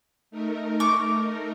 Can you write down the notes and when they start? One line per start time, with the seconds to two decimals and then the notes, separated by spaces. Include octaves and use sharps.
0.31 A3 D#4 A#4
0.80 C#6 D6